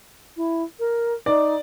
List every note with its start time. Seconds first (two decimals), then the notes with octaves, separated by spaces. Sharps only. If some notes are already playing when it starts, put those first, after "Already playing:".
0.37 E4
0.79 A#4
1.26 D#4 D5